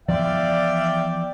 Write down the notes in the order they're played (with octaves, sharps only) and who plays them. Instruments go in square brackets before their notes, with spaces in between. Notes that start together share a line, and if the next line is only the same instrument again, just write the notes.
[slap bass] E3 F3 B3 [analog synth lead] D5 [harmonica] E5 F5 G5